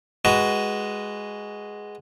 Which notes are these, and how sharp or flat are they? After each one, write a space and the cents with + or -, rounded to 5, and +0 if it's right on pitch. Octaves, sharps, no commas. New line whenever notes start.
G#3 +0 F#4 +10 B4 +0